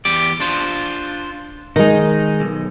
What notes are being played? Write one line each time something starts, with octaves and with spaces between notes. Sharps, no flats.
E2 G4 D5
D4 F4 C5
D#3 G#3 D#4
B1